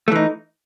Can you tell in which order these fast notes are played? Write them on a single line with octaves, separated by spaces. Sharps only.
A3 E3 D#4